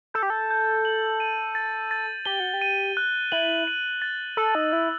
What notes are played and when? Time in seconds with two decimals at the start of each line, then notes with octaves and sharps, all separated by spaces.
0.14 A4 G6
0.23 G4
0.30 A4
0.50 G6
0.85 F#7
1.20 D#7
1.55 A6
1.91 A6
2.25 G4 G7
2.40 F#4
2.53 G4
2.61 D#7
2.97 F#6
3.32 E4 F#7
3.67 D#7
4.02 A6
4.37 A4 E6
4.55 D#4
4.72 E4 E6